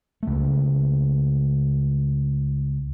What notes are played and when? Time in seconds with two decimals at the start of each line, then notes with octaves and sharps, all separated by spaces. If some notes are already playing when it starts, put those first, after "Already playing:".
0.23 C#2 A3